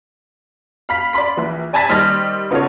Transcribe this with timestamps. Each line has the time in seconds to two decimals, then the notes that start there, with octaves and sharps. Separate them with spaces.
0.89 F5 B5 B6
1.13 D5 F5 B5 C6 B6
1.37 A#1 E3
1.73 D5 G#5 A5 B5 A6 B6
1.89 D#3 G3 C5 D#5 F6 A#6
2.51 C#3 B3 D#4 F4 A4 C#5